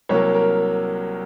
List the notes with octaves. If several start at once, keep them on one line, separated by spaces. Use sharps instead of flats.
C2 C3 F#3 A#3 C#5
A#4